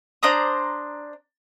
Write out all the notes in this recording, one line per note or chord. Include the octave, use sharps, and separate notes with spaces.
D4 C5 A#5 D#6